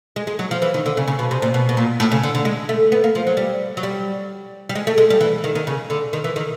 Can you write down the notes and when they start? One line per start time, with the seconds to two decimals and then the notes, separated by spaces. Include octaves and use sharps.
0.16 G#3
0.27 G#3
0.39 F#3
0.51 F3
0.62 E3
0.74 D#3
0.86 D3
0.97 C#3
1.08 C#3
1.19 B2
1.31 C3
1.42 A#2
1.54 B2
1.69 B2
1.77 A#2
2.00 A2
2.12 C#3
2.23 D3
2.35 D3
2.45 G#3
2.69 A3
2.92 B3
3.04 A#3
3.15 F3
3.27 F#3
3.37 G3
3.77 F#3
3.83 G3
4.69 G3
4.75 G#3
4.87 A3
4.98 G#3
5.10 G3
5.21 E3
5.44 D#3
5.55 D#3
5.67 C#3
5.90 D3
6.13 D#3
6.24 E3
6.36 D#3